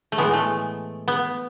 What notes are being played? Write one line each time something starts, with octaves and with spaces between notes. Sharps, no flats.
A3
A2 E3 G#3 B3
A3
B3